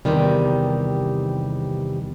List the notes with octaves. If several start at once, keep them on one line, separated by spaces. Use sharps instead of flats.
E2 C3 D#3 G3